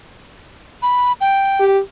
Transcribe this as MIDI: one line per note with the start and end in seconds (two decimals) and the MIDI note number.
0.82 1.12 83
1.21 1.66 79
1.60 1.79 67